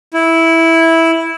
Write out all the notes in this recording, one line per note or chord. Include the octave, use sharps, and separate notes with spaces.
E4